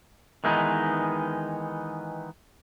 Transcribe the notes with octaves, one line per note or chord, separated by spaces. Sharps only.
D#3 E3 G#3 B3 D#4